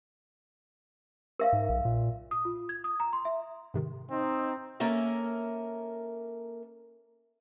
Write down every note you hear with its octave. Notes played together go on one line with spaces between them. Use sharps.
A#4 E5 F5
G#2
B1
A#2
D#6
F4
G#6
D#6
A#5
C6
E5
G#2 C3 D#3
C4 D#4
A#3 C#4 A4 A#4 E5